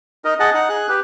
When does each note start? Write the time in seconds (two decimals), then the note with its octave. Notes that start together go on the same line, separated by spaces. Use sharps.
0.25 D#4 A#4 D#5
0.40 G#4 D#5 F#5 A5
0.54 D#4 F#5
0.69 G#4 F#6
0.89 G4 B4